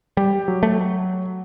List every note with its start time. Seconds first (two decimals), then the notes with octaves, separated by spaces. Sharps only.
0.17 G3 G4
0.48 F#3
0.63 A3